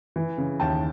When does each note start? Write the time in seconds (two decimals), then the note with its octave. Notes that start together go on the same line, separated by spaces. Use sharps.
0.16 E3
0.38 C#3
0.60 D#2 G5 A5